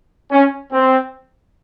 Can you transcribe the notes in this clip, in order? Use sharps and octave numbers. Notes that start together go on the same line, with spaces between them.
C#4
C4